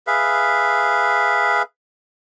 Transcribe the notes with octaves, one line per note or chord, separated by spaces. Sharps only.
G#4 B4 E5 F5